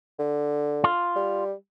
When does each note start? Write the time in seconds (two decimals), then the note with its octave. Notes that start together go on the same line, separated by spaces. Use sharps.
0.19 D3
0.84 F4
1.16 G3